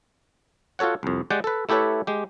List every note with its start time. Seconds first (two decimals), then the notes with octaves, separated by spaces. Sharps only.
0.79 F4 F#4 A4 C#5 F#5
1.03 C2 F2
1.30 G#3 G4 D5 F#5 G5
1.44 A4 B4
1.69 A3 E4 G4 A4 B4 C#5
2.07 G#3 G4